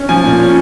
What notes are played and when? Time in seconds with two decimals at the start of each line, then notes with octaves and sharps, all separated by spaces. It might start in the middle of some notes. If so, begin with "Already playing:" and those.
Already playing: C#4
0.09 F3 G#5
0.24 A#2
0.40 C#4